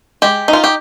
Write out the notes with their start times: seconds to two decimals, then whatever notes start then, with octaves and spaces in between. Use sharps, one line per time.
0.22 G#3 G4
0.48 D#4
0.53 F4
0.64 G4